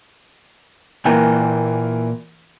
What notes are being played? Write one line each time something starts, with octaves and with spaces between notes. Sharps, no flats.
A#2 E3 A#3 A#4 G5 G#5